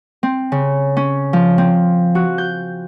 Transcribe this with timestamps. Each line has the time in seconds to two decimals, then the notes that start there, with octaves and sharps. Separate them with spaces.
0.23 C4
0.52 C#3
0.97 C#4
1.33 F3
1.58 C4
2.15 F#4
2.38 G6